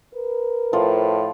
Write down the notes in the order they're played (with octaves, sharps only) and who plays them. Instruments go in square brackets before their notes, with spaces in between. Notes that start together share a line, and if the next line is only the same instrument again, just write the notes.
[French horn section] A#4 B4
[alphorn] A2 [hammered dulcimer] F3